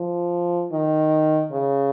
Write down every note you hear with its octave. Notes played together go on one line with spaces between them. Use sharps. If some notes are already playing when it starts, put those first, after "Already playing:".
Already playing: F3
D#3
C#3